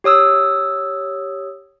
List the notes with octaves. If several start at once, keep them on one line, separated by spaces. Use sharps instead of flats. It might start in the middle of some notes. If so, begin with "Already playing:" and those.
G4 C#5 D#6 E6